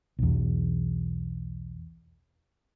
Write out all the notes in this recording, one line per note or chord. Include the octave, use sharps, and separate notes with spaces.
B1 E2